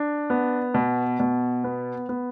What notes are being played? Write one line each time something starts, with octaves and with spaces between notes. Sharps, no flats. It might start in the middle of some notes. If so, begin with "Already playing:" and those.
Already playing: D4
B3
B2
B2
B3
B3